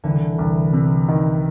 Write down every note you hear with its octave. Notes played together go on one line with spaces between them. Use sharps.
C2 D3 E3
C2
C3
D#3